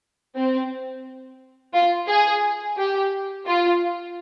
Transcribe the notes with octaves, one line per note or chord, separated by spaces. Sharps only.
C4
F4
G#4
G4
F4